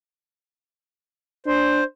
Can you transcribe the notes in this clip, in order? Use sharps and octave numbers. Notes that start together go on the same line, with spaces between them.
D4 C5